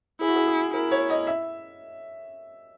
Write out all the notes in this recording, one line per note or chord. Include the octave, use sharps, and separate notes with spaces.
E4 G#4
F#4
G#4
G#4
E4 A#4
C#5
D#5
E5